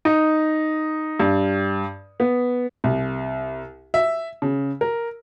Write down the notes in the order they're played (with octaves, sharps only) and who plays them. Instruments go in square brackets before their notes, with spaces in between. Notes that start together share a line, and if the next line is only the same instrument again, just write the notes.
[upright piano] D#4
G2
B3
C2
E5
C#3
A#4